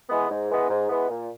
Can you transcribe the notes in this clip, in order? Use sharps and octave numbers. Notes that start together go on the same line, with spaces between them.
E3 G#3 B3
G#2
E3 G#3 B3
G#2
E3 G#3 B3
A#2